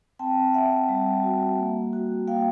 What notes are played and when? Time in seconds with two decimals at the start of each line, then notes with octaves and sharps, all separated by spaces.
0.19 C4 G5 A5
0.54 C4 E5 F#5
0.89 G3
1.23 F#4
1.58 A#3
1.93 F#4
2.27 A#3 F5 G5